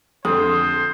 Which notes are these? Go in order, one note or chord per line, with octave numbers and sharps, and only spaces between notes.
F2 D3 A4 C5 D#6